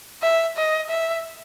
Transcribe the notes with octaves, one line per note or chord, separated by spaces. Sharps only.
E5
D#5
E5